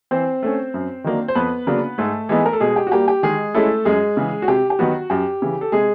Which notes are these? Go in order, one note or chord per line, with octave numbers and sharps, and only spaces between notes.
E3 C4 C5
A3 C#4
F#2
D#3 F#3 A#3 D4
C5
F2 B3 B4
C#3 F#3 A#3 D4
G#2 A3 A4
E3 G#3 B3 D#4
A#4
A4
B2 G#3 G#4
G4
F#4
G3 A#3 G4
G4
D#3 G#3 G#4
G#3 A3 C#4 E4 A4
F#2 G#3 G#4
C#3 E3
F#4
C3 G4
G4
D#3 F#3 B3 F#4
F#2 G4
C#3 E3
A4
C3 G#3 G#4